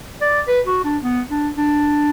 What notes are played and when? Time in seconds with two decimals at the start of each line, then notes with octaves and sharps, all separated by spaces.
0.21 D5
0.48 B4
0.67 F#4
0.84 D4
1.02 B3
1.30 D4
1.57 D4